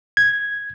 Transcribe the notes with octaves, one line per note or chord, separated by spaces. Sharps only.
G#6